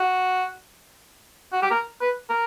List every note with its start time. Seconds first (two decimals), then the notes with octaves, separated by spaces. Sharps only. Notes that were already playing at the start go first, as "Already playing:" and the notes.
Already playing: F#4
1.53 F#4
1.62 G4
1.70 A#4
2.01 B4
2.30 A#4